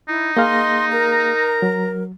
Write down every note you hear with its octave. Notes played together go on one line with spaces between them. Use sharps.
D#4 E4
A#3 G#4 D#5 F5 C6
A#4 A#5
F#3